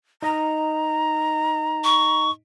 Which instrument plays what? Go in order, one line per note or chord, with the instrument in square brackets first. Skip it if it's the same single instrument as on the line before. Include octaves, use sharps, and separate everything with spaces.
[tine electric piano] D#4 D#5 [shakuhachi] A#5
[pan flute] C#6